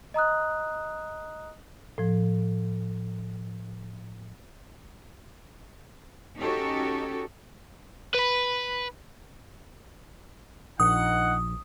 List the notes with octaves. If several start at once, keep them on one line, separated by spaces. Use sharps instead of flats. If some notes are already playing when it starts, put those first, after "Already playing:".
D#5 A#5 D#6 F#6
A2 F3
C#4 D#4 F#4 G4 A4 C#5
B4 B5
A#1 D#4 F#5 D#6